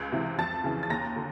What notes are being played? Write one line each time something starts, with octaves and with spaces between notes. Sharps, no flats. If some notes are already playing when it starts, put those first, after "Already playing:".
Already playing: C#2 G#6
C3 E3
F2 A5 A6
C#3 E3
A6
D#2 A#5 A#6
D3